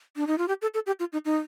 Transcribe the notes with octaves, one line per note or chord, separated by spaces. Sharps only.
D4
D#4
F4
G4
A4
A4
G4
F4
D#4
D#4